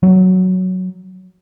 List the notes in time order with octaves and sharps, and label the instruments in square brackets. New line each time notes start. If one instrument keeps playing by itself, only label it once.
[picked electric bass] F#3